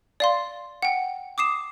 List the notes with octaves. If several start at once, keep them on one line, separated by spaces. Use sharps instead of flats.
D5 F5 C6
F#5 G5
D6 D#6 C7 E7